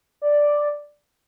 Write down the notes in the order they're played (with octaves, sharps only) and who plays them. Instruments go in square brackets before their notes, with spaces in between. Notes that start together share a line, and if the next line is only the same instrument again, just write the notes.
[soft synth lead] D5